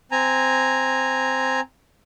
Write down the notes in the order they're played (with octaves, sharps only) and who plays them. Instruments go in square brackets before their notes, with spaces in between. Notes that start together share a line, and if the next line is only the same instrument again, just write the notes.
[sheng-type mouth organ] C4 G#5 A#5